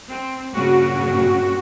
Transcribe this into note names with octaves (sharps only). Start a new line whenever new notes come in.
C4
G2 A#2 C#3 F#4